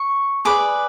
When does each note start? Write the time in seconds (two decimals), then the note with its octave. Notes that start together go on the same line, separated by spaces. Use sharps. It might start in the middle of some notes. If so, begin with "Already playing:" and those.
Already playing: C#6
0.45 G#4 B4 D5 D6